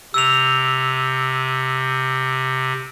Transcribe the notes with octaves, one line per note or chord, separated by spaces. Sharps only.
C3 E6 F7